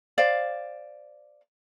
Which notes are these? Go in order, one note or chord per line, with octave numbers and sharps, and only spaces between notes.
C5 D5 F5